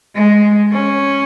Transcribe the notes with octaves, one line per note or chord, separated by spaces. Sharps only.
G#3
C#4